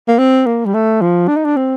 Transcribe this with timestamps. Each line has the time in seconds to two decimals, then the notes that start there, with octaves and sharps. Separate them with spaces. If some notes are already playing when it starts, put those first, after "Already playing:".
0.08 A#3
0.19 C4
0.46 A#3
0.66 G3
0.74 A3
1.01 F3
1.28 D4
1.36 D#4
1.45 D4
1.57 C4